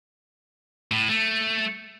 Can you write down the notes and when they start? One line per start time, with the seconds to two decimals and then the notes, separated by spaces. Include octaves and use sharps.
0.92 A2
1.09 A3